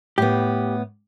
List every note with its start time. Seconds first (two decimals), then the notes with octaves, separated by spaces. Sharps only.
0.18 A2 B3 G4